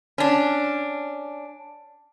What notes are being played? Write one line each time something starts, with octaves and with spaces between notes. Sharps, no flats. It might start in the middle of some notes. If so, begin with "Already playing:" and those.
C#4 D4